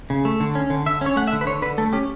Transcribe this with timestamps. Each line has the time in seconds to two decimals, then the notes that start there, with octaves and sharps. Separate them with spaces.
0.10 C#3
0.25 A3
0.40 D3
0.55 C#4
0.70 D3
0.86 D3 E5
1.01 C#4 C#5
1.16 A3 F#5
1.27 E5
1.32 D3
1.41 B4
1.47 D3 C#5
1.62 D3 B4
1.78 A3 A4
1.93 C#4 G4